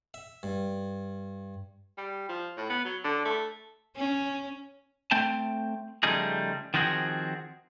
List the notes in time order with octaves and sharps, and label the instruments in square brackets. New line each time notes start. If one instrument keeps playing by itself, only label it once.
[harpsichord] E5
G2
[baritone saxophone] G3
F3
A2
B3
F#3
D3
A3
[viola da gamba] C#4
[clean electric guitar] A3 C4 G5 A5
C#3 F3 G3 A3 D#4 G#4
D#3 F3 C4 F#4 G#4